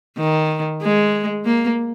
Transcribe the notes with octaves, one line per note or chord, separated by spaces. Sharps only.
D#3
G#3
A#3